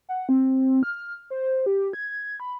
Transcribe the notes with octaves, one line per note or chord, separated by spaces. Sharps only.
F#5
C4
F6
C5
G4
G#6
B5